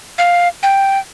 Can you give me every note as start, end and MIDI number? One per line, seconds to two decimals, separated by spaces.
0.18 0.48 77
0.63 0.98 79